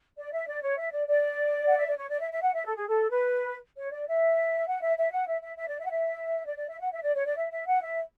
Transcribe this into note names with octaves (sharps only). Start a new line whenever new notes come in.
D5
E5
D5
C#5
E5
D5
D5
F#5
E5
D5
C#5
D5
E5
E5
F#5
E5
A4
G#4
A4
B4
C#5
D5
E5
F#5
E5
E5
F#5
E5
E5
E5
D5
E5
F#5
E5
D5
D5
E5
F#5
E5
D5
C#5
D5
E5
E5
F#5
E5